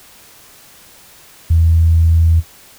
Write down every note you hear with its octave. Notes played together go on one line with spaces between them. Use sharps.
E2